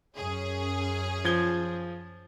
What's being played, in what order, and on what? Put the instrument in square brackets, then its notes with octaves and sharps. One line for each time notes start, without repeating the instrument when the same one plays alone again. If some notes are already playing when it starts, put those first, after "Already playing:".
[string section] F#2 C#4 G#4
[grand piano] F3 G#6 G7